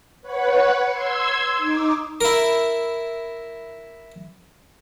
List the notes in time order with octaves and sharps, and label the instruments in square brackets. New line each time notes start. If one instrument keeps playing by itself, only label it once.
[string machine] B4 C#5 F#5
C6 E6 G#6
D#4 D6
[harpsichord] E4 A#4